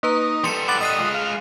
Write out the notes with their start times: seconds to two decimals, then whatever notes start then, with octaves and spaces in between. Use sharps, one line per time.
0.03 A#3 D#4 B4 A#5
0.44 G3 A4 C6 C#7
0.68 F#5 B5 D6 A6
0.81 D#5 F#6 C7 D#7
1.00 G#3 F4
1.14 F5